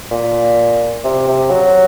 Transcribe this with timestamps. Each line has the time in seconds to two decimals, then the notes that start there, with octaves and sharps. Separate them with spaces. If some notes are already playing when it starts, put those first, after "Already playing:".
0.11 A#2
1.04 C3
1.28 C3
1.50 F#3